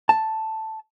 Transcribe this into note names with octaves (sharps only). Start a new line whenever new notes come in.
A5